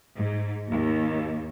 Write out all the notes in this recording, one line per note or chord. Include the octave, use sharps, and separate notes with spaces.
G#2
D#2